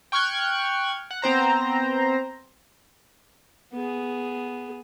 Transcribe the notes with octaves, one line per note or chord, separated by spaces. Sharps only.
G5 C#6 F6 F#6 G#6
F#5
B3 C4 C5 A#5
B3 G#4